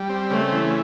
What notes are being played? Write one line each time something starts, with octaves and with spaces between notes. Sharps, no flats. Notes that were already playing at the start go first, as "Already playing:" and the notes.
Already playing: G3
C4
C#3 A3
E3